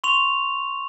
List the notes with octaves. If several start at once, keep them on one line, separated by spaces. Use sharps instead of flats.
C6 C#6 F7